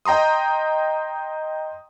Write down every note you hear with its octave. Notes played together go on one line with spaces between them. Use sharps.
D#5 G5 A#5 C6 D#6